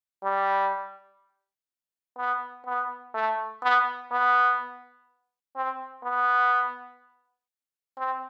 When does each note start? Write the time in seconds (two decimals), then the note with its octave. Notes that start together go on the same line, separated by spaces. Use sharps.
0.24 G3
2.18 B3
2.66 B3
3.14 A3
3.62 B3
4.11 B3
5.56 C4
6.04 B3
7.97 C4